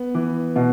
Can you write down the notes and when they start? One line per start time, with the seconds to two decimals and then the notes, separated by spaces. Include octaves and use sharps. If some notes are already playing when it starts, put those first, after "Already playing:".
Already playing: B3
0.15 E3
0.56 B2